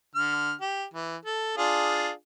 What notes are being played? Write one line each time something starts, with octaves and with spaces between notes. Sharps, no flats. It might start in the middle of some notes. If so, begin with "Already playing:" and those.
D3 F6
G4
E3
A4
D4 F4 G#4